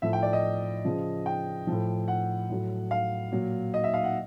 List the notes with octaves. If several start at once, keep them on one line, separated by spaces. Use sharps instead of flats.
A2 F3 E5
G5
D5
D#5
C#3 F3
G5
A2 F3
F#5
A2 F#3
F5
A#2 F#3
D#5
E5
F5
F#5